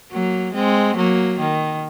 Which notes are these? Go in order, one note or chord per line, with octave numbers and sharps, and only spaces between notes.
F#3 A#3
G#3 C4
F#3 A#3
D#3